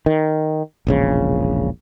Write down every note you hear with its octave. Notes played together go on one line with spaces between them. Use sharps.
D#3
E1 A#1 C#3